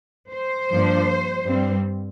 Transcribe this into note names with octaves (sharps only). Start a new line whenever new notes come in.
C5
G2 F3 A#3 D4
G2 G3 C4